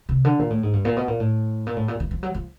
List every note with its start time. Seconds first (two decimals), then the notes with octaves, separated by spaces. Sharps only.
0.09 C3
0.25 D3
0.39 A#2
0.50 A2
0.63 G#2
0.73 G2
0.85 A#2
0.97 B2
1.08 A#2
1.20 A2
1.67 A#2
1.77 A2
1.88 A#2
2.00 E3
2.11 F3
2.23 F#3
2.34 F3